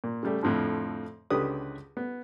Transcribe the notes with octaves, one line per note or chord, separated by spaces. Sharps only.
A#2
C#3 G3 A3
F2 A2 D3 F3
C#2 D3 G4 B4 D#6
B3